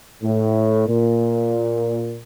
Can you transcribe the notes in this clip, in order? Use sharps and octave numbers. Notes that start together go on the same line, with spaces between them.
A2
A#2